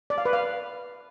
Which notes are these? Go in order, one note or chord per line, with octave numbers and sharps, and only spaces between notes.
D5
F5
B4
F5